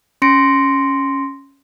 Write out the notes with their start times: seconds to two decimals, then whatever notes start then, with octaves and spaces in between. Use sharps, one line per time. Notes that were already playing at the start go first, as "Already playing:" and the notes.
0.22 C#4 C6 A#6 C#7 D7